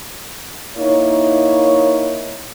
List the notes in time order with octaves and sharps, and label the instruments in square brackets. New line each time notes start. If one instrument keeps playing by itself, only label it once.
[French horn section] A#3 D#4 E4 C#5